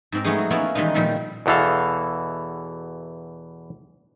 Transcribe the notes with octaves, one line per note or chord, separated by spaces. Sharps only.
G#2 C4 A#4
G#3 A3 B3 C#4 D#4 G#4
F#3
A#3 B3 C#4 E4 F4 A#4
D#3 E3 G3 G#3 D#4
A#2 D#3 F3 G3 G4 A4
E2 B2 E3 A4 F5